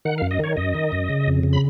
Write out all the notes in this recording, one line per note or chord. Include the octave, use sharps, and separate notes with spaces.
D#3 F#5
F#2 F5
D#5
D#3 C#5
F#2 D#5
D#3
F#2
C#3
F2
C#3
B5